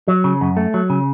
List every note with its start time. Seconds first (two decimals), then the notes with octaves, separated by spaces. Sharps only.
0.08 F#3
0.24 C#3
0.41 F#2
0.57 A3
0.74 F#3
0.90 C#3